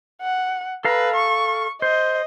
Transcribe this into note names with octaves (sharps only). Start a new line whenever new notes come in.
F#5
A4 B4 F5 A#5
C#6
C5 D#5